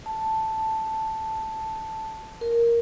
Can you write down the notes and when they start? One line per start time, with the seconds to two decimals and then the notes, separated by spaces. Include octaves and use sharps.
0.06 A5
2.41 A#4